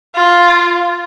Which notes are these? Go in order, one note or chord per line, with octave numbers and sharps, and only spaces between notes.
F4